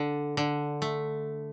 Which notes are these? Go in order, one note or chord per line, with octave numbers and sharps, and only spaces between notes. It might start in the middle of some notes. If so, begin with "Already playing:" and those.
Already playing: D3 D4
D3
A3